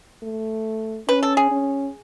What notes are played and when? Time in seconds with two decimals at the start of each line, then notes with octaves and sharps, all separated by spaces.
0.23 A3
1.08 C#4 B4
1.23 A4
1.37 G#4
1.51 C#4